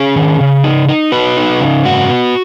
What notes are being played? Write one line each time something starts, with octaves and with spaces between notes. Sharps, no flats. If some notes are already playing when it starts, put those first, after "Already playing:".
Already playing: C#4 G#4
D#3
C#3
D#4
D#4
B3 F#4 B4
D#4
C#3
G#2 F#4
B3